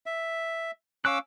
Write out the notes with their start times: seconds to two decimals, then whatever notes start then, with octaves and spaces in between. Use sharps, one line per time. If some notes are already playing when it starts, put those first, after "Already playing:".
0.06 E5
1.05 C#4 F5 C#6 D6 E6 F#6